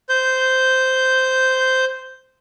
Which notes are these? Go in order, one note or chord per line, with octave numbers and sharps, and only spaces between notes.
C5 G6